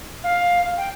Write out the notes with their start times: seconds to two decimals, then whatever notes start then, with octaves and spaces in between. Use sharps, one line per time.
0.24 F5
0.78 G5